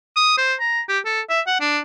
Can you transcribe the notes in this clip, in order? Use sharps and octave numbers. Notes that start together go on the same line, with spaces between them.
D#6
C5
A#5
G4
A4
E5
F#5
D4